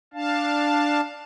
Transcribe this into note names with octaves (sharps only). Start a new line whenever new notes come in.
D4 F5 A5